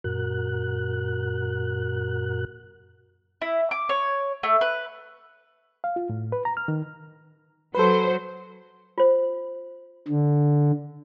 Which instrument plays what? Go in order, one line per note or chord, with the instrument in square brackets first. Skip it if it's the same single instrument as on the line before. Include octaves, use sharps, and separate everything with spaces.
[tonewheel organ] F#2 A#2 F#4 A#4 F#6
[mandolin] E4
D6
C#5
A3
B4
[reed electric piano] F5
F4
A2
B4
A#5
F6
D#3
[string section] F#3 C5 [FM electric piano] A4 B4
[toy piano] F4 C5
[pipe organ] D3